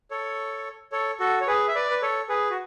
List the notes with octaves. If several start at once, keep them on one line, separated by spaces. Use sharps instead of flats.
A4 C#5
A4 C#5
F#4 A4
C#5
G#4 B4
E5
B4 D5
B4
A4 C#5
G#4 B4
F#4